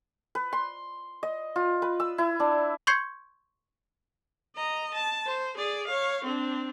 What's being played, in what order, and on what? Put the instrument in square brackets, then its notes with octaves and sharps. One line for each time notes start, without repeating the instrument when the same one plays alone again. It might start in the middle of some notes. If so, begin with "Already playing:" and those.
[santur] B4
C6
D#5
F4
B4
E6
E4
D4
[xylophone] C6 C#6 G6 G#6 C7 C#7
[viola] D#5 A#5
A5
C5
G#4 D5
C#5 F5
C4 D4